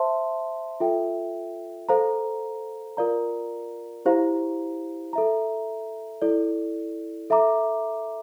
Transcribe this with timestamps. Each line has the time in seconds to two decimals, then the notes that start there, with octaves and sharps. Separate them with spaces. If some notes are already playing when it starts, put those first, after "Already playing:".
Already playing: C5 E5 A5 C6
0.80 F4 A4 E5 G5
1.89 A4 C5 F5 A#5
2.97 F4 A#4 D5 F5 A#5
4.06 E4 G4 C5 F5 A#5
5.13 A4 E5 A#5
6.22 E4 A4 D5
7.30 A4 E5 A#5 D6